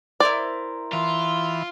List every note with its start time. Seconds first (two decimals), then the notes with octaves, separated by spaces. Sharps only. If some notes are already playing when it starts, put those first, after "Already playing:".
0.20 E4 A#4 C5 D5
0.93 E3 F4